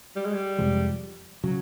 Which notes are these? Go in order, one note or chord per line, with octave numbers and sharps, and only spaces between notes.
G3
G#3
G3
F2 C3 F3 G#3
C#3 F#3